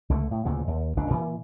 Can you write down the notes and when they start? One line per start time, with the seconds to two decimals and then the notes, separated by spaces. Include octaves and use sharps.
0.09 C#2 D3 G3 A3
0.31 A2
0.45 D2 A#2 C#3 E3
0.67 D#2
0.96 F#1 C#2 D3 D4
1.10 A#2 E3